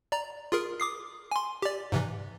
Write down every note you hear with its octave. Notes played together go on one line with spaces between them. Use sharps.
D5 A#5
F4 G#4 A#4
D6 D#6 C7
G#5 C6
G4 D5
G#2 C3 E3